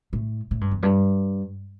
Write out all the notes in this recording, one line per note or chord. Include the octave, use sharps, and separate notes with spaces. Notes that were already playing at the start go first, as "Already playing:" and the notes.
A2
A2
G2
E2
G2